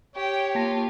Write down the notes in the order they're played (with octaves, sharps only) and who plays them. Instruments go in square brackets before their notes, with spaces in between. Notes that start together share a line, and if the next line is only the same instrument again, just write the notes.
[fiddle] G4 [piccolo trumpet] C#5 [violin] G5
[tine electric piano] A#3 A5 A#6 [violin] F4